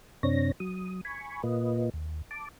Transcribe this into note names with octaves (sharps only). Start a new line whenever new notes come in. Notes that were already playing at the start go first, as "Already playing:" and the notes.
F#2 C3 C4 D4 C#5 A#6
F#3 D#6
G#5 B5 C#6
A#2 A#3 F4 B4 D#5
D#2
A5 D6